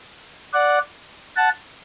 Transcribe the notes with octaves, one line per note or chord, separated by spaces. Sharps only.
D5 F#5
F#5 A5